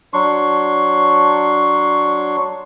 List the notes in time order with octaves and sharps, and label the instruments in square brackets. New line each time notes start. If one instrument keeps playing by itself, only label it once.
[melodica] F#3 D4 C6 C#6